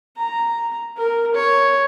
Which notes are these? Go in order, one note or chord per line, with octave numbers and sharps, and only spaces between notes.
A#5
A#4
C#5